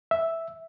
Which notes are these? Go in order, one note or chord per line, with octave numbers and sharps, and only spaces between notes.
E5